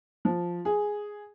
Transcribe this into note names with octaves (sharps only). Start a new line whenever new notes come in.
F3
G#4